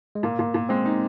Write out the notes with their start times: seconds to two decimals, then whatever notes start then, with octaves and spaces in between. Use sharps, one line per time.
0.15 G#3
0.23 A#2 A#3
0.39 A#2
0.54 A#2
0.69 G#3 C4
0.86 D#4